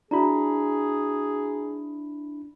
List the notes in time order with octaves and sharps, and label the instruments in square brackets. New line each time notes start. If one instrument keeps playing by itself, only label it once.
[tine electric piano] D4 E4 B5 [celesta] F#4 D5 A#5 [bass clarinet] G#4